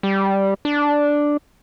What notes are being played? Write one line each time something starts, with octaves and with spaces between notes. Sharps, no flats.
G3
D4